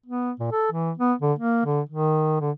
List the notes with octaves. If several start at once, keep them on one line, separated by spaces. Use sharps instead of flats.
B3
A#2
A4
E3
B3
D3
A#3
D3
D#3
D3